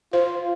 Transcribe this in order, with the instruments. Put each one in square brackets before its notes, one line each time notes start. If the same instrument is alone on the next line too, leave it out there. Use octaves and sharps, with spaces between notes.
[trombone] F4 [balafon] C5